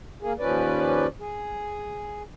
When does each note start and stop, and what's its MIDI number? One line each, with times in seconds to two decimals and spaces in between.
0.22 0.33 58
0.22 0.33 68
0.39 1.07 39
0.39 1.07 53
0.39 1.07 61
0.39 1.07 71
0.39 1.07 74
1.20 2.23 68